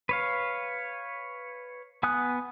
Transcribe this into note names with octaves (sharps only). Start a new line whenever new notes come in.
B4 C#5 F5
B3 G#5 D#6 F#6